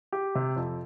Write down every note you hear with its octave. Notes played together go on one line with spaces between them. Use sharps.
G4
C3
F2